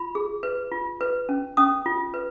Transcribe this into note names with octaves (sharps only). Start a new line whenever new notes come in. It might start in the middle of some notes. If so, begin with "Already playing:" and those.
Already playing: F4 B5
G#4
B4
F4
B4
C#4
C#4 D#6
F4
B4